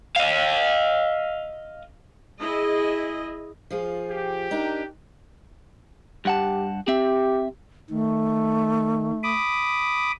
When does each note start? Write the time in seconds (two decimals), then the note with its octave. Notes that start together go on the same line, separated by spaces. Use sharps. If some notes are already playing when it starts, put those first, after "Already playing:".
0.16 D#5 F5
2.41 E4 G#4 D#5
3.70 F3 F4 G#4
4.11 G4
4.51 D4 D#4 A#4
6.25 G2 G4 F#5 A5
6.88 C4 G4 E5
7.90 D#3 A3
9.23 B5 D6 D#6